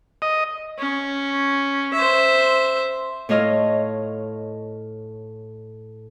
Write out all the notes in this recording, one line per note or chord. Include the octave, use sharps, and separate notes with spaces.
D#5
C#4
C5 E5
A2 A3 F4 C#5 D#5 F6